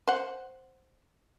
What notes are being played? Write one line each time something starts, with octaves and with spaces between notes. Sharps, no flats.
C5 F#5